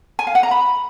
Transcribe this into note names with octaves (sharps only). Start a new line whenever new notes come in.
G#5
F5
F#5
A#5
B5